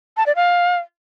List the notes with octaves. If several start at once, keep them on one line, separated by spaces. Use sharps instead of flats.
A5
D5
F5